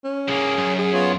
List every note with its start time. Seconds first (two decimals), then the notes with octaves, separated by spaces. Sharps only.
0.04 C#4
0.28 C2 A#3 G#4
0.58 F#2
0.79 G#4
0.93 B3 F4 C#5